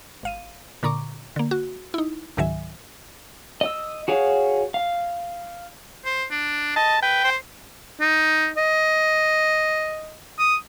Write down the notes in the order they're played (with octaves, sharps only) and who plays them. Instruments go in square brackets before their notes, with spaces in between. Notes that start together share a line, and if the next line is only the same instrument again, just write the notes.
[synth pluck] G#1 F5 D#7
A#2 D3 A#5 C#6 D6
D3 A#3
F#4
D#4 E4
C#2 G#2 D#3 F#3 E5 G#5
[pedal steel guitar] D#5 E6
F#4 G#4 C#5 F5
F5
[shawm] C5
D4
[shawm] D#5 [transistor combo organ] A5
[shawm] B4 [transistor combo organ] G5
[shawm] C5
D#4
D#5
D#6